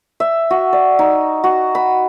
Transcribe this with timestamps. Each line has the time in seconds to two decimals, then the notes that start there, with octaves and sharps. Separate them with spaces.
0.20 E5
0.50 F#4
0.73 D5
0.99 D#4
1.44 F#4
1.75 B5